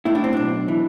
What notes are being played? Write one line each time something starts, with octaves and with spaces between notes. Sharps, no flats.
A2 E4
D4
C4
B1 D4
E3